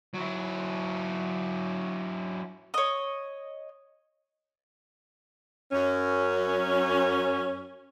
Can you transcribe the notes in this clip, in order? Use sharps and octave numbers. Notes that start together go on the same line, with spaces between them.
F#3 E4
C#5 D#5
F#2 C#4